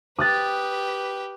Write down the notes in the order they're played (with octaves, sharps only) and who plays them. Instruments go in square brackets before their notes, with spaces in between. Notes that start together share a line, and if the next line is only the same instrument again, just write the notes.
[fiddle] G4 B4 [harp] D#6 F#6 A6